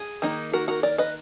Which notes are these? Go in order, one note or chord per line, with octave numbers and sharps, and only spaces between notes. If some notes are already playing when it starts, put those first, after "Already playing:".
Already playing: G#4
D#3 A#3 D#4
F#4 A#4
F#4 A#4
A#4 D5
B4 D#5